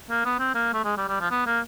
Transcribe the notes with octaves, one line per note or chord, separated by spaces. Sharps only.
A#3
B3
C4
A#3
A3
G#3
G3
G3
F3
B3
A#3